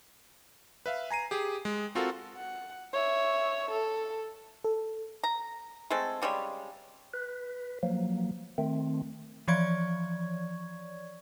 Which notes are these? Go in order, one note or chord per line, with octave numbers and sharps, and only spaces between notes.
B4 E5 F5
G#5 A#5 C7 D#7
G4 G#4
G#3
C4 F4 F#4 A4 A#4
F#5
C#5 E5
A4
A4
A#5
G#3 A3 C4 A4
C#3 G3 G#3 C#5
B4
F3 F#3 A#3
D#3 A3 C4
E3 F3 C#5 D5 C#6 G#6